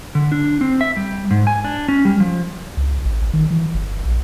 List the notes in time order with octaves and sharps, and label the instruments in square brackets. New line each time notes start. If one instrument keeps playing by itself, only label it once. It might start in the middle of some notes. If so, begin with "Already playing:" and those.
[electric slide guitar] D3
D4
C4
E5
G3
G#2
G#5
D4
C#4
G3
F3
[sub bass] C#2
A1
D#3
E3
G1
A#1